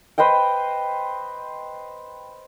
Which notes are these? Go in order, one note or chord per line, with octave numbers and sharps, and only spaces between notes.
B4 C5 D#5 G5